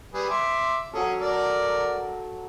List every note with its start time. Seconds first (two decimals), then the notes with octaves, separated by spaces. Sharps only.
0.14 G3 G#4 B4
0.30 E5 C6 D6
0.93 F#3 C#4 G#4 A4
1.20 A#4 D5